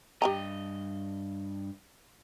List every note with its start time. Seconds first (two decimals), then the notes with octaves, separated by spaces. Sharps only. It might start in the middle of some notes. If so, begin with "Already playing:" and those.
0.22 G2 G4 D#5 G5 A#5